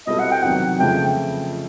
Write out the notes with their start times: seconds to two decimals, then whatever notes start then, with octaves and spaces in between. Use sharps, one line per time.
0.07 B2 G3 C4 E4 A4 D#5
0.19 F#5
0.31 G5
0.42 E2 C3 D#3 F#3 F#5
0.78 F2 C#3 F3 A3 G5